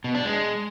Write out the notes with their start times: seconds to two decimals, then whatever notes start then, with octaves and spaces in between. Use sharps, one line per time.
0.04 B2
0.15 D4
0.25 G#3